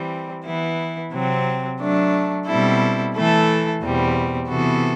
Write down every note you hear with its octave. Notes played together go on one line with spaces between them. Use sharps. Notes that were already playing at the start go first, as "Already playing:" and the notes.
Already playing: E3 G3 C4
E3 B3 E4
C3 F#3 C4
F#3 A3 D4
B2 G3 C4 E4 A4
E3 A3 E4 A4
E2 B2 G3 C4
C3 E3 B3 F#4 A4